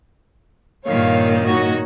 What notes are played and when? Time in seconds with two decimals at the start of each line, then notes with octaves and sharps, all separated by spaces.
0.86 G2 A#2 D#3 G3 C#5 F5
1.44 D#4 F#4 C#5